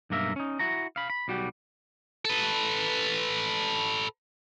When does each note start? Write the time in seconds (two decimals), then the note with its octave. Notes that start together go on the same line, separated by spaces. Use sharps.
0.10 B1 G2 A#3 A#4 E5
0.36 C#4 D#4
0.59 E4 F#4 A#5
0.96 F5 B5
1.10 B5
1.28 B1 G3 F#4 G4
2.25 A4 B4